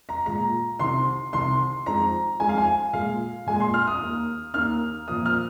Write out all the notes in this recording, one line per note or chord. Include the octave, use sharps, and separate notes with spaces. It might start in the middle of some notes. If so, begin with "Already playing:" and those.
A#5
A#2 G#3 A#5
C2 C3 D#3 C6
C2 C3 D#3 C6
F2 D#3 G#3 A#5
F2 D#3 G#3 G#5
F5
G#5
A#2 G#3 F5
A#2 G#3 G#5
C6
F6
D#6
D#2 D#3 A#3
D#2 D#3 A#3 F6
A#2 F3 A#3 D#6
F6